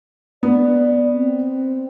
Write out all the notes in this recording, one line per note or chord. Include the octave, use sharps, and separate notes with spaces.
B3 D5
C4